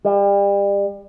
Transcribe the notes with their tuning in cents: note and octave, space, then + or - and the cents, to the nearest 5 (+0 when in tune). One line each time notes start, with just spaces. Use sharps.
G3 +35